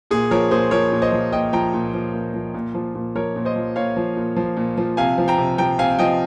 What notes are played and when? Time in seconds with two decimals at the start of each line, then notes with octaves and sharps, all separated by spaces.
0.11 A#2 G#4
0.31 F3 A#4 C#5
0.51 A#2 G#4 C5
0.71 F3 A#4 C#5
0.92 A#2
1.02 C5 D#5
1.12 F3
1.32 A#2 D#5 G5
1.53 F3 G5 A#5
1.73 A#2
1.94 F3
2.14 A#2
2.34 F3
2.54 A#2
2.74 F3
2.95 A#2
3.15 F3 A#4 C#5
3.36 A#2
3.45 C5 D#5
3.56 F3
3.76 A#2 C#5 F5
3.97 F3
4.17 A#2
4.36 F3
4.57 A#2
4.78 F3
4.97 C3 F5 G#5
5.18 F3
5.28 G5 A#5
5.38 C3
5.58 F3 G5 A#5
5.79 C3 F5 G#5
5.99 F3 D#5 G5